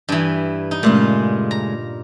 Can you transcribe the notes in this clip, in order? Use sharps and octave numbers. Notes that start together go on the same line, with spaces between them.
G2 E3
D#4
A#2 C#3 G#3 A3
A#5